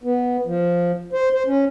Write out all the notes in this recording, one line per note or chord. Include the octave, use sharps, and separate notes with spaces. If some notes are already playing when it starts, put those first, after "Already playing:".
B3
F3
C5
C5
C#4